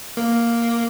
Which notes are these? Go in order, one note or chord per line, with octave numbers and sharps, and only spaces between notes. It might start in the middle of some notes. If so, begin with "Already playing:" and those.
A#3